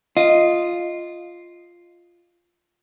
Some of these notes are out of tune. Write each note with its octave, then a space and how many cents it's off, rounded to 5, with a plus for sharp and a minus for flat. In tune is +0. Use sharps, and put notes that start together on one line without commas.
F4 +0 D#5 +0